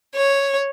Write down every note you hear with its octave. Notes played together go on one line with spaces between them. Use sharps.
C#5